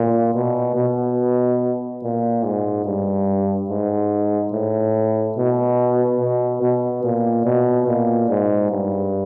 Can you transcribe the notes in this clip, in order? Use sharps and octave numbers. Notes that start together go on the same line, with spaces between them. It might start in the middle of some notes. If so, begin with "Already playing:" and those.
Already playing: A#2
B2
B2
A#2
G#2
G2
G#2
A2
B2
B2
B2
A#2
B2
A#2
G#2
G2